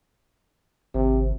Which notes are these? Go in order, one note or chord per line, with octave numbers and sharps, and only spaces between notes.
G#1 C3